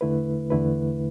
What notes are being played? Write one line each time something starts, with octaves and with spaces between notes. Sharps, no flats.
E2 D3 A3 E4 B4
E2 D3 A3 E4 B4